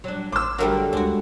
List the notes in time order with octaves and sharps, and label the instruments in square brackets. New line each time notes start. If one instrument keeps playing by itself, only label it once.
[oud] F#3 D4
[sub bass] A1 [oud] C5 [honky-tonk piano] D6 E6
[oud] D3 F#3 A#4 [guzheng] G3 A3 F#4
[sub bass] D2 [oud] G#3 [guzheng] D4 F#4